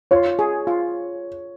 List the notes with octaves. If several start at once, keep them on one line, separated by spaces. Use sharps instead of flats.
F4 C#5
G#4
F4